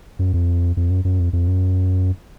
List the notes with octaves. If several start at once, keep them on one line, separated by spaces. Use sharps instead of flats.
F#2
F2
F2
F#2
F#2
F2
F2
F#2